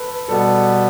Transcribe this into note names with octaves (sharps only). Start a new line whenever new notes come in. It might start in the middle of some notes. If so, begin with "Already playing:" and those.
Already playing: A4 B4
B2 G3 B3 A4